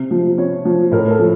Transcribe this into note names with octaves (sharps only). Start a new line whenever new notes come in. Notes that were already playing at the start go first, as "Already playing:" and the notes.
Already playing: C3
F3
C3 C#5
F3
A2 A#4
A4
F3